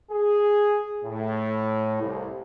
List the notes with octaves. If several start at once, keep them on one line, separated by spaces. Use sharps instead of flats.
G#4
A2
C2